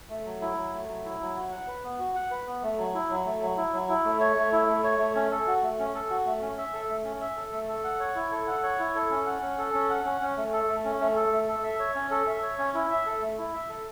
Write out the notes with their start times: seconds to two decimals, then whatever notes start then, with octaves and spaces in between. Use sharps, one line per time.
0.10 A3
0.25 F#3
0.41 E4
0.57 F#3
0.73 A3
0.89 F#3
1.04 E4
1.20 F#3
1.36 F#4
1.51 F#5
1.67 B4
1.84 B3
1.99 F#4
2.15 F#5
2.31 B4
2.46 B3
2.62 A3
2.78 F#3
2.94 E4
3.10 F#3
3.25 A3
3.41 F#3
3.57 E4
3.73 F#3
3.89 E4
4.04 A3
4.20 C#5
4.36 A3
4.52 E4
4.68 A3
4.84 C#5
4.99 A3
5.16 C#4
5.31 A4
5.47 F#4
5.63 A3
5.79 C#4
5.95 A4
6.10 F#4
6.26 A3
6.42 C#4
6.58 E5
6.73 A4
6.89 A3
7.05 C#4
7.21 E5
7.36 A4
7.52 A3
7.68 A4
7.84 F#5
7.99 C#5
8.15 E4
8.31 A4
8.47 F#5
8.63 C#5
8.79 E4
8.95 A4
9.10 C#4
9.26 F#5
9.42 C#4
9.58 A4
9.74 C#4
9.90 F#5
10.05 C#4
10.21 C#4
10.37 A3
10.53 A4
10.68 A3
10.85 C#4
11.00 A3
11.16 A4
11.32 A3
11.48 A4
11.64 E5
11.79 C#5
11.95 C#4
12.11 A4
12.27 E5
12.43 C#5
12.58 C#4
12.74 E4
12.90 E5
13.06 A4
13.21 A3
13.38 E4
13.53 E5
13.69 A4